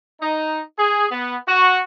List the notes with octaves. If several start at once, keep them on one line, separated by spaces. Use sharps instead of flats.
D#4
G#4
B3
F#4